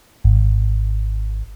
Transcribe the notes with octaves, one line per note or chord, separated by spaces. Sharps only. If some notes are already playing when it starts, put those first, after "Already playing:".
G#1